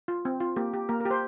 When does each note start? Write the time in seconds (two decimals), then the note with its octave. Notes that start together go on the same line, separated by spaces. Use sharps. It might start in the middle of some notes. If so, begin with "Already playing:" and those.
0.08 F4
0.25 C4
0.40 F4
0.56 A#3 G4
0.74 G4
0.89 A#3 A#4
1.00 A#4
1.05 G4
1.11 C5